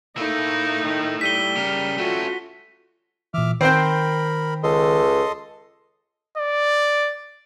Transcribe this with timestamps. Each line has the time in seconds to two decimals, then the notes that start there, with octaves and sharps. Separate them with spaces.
0.17 A3 A#3 D#4 E4
0.85 D#3
1.21 G3 B6 D#7 G7
1.57 C#3 A#4
1.98 A3 C#4 F4 F#4
3.34 A#2 E3 E5 D6 F6
3.61 D#3 C4 A#4 C5 G5 B5
4.63 C#2 A4 D#5 C6
6.38 D5